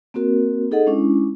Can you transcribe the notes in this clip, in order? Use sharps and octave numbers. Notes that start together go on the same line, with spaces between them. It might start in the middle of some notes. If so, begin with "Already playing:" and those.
A#3 C4 F#4 A#4
D#4 G#4 A4 D#5 F#5
G#3 C#4 D4 E4